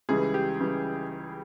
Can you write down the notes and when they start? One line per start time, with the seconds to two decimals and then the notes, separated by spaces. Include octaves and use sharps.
0.09 C#2 C#3 E3 G3 G#4
0.34 G4
0.60 C#3 E3 G3